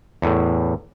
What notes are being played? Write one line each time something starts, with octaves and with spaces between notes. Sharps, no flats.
E2 A2